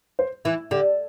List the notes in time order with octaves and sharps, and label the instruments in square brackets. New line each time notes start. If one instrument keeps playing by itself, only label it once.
[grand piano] C5
[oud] E3 [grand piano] E4
[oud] D3 [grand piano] G4